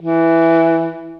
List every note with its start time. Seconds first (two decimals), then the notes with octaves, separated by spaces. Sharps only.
0.01 E3